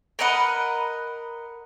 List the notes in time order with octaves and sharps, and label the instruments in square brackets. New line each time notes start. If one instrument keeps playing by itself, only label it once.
[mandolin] A#4 B4 D#5 F#5